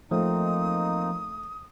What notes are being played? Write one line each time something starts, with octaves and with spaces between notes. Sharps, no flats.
F3 A3 A#3 C4 D#4 D#6